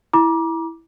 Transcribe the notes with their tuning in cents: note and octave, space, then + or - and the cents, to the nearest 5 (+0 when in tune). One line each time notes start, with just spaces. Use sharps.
E4 +0 A#5 +40 D6 +0